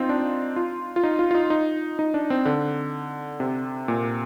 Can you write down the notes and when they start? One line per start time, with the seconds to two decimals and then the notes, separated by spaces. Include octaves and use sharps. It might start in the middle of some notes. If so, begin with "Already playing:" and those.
Already playing: C4 D#4 F4
0.09 D4
0.56 F4
0.96 F4
1.03 D#4
1.19 F4
1.31 F4
1.35 D#4
1.50 D#4
1.99 D#4
2.14 D4
2.30 C4
2.45 D3
3.40 C3
3.88 A#2